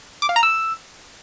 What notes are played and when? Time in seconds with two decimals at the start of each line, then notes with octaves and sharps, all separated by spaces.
0.22 D6
0.29 F5
0.36 A#5
0.43 E6